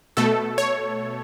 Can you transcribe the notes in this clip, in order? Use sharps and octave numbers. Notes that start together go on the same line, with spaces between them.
B2 A3 A4
C#5